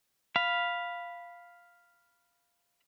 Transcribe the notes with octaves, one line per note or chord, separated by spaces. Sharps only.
F5 B5